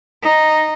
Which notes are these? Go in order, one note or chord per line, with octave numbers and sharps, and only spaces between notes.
D#4